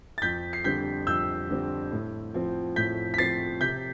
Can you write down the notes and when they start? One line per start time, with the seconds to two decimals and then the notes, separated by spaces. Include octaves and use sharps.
0.18 A6
0.22 F2 G6 B6
0.53 C7
0.64 D3 G3 C4 G6 B6
1.07 F2 E6 G6
1.49 D3 G3 C4
1.92 A2
2.34 F3 C4
2.76 A2 G6 B6
3.14 B6
3.18 F3 C4 A6 C7
3.61 C3 G6 B6